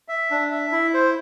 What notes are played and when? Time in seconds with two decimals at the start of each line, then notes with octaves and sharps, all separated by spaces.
0.08 E5
0.31 D4
0.51 E5
0.72 E4
0.94 C5